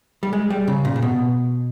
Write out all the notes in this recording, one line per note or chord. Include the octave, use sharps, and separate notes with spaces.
G3
G#3
G3
C#3
A#2
A#2
B2